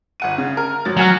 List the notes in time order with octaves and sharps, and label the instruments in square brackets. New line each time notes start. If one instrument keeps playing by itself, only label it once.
[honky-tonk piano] G1 F#5 D#7
C#3
A#4
G#1 F#3 A6
[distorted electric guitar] F#3 [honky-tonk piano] F#5 G#5 F6